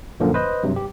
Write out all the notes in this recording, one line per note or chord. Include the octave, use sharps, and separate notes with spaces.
F#2 A#2 D3 F3 A#3
B4 C5 D#5
G2 C3 F#3
G4